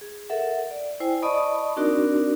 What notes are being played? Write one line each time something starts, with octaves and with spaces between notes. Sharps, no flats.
G#4
A4 A#4 E5 F#5
D5
E4 C5 G5 G#5
D5 D#5 A5 B5 C#6 D#6
C4 D4 D#4 F#4 A#4 D5